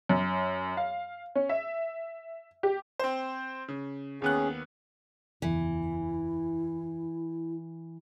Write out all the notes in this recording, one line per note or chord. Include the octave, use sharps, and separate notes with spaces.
F#2
F5
C#4
E5
G4
C4 C5
C#3
D#2 B3 C#4 G#4 F#6
F#1 E2 E3 E4